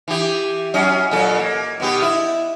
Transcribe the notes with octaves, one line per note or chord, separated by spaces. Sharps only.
E3 G4
F#3 C#4 D#5
A#2 F#3 A4
A#3
B2 B3 G4
E4